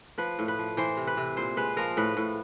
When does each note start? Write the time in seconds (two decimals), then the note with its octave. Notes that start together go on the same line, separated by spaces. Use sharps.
0.18 F3 B4
0.39 A2
0.48 B4
0.59 F3
0.77 E3 C5
0.97 C3
1.07 B4
1.17 C3
1.37 A#2 C5
1.57 G#3 B4
1.77 F3 A#4
1.97 A2 B4
2.17 A2